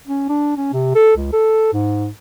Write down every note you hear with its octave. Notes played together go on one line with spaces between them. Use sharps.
C#4
D4
C#4
C3
A4
C#2
A4
G#2